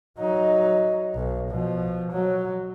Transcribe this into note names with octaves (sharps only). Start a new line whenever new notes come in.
F#3 D#4
B1
B2 F3
F#3